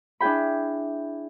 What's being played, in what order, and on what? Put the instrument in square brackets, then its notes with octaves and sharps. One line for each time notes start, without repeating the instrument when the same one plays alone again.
[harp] D4 E4 G#4 G5 B5